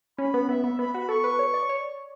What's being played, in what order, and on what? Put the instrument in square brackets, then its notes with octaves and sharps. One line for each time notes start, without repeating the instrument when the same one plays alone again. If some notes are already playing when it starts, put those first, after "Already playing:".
[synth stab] C#4 [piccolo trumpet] B5
[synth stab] B3
[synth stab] B3 [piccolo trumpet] E5
[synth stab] B3
[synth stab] B3 [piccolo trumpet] B5
[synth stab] F#4
[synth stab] A4 [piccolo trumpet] C#6
[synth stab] B4
C#5
D5
C#5